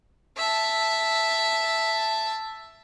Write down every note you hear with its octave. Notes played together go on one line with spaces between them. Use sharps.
E5 A5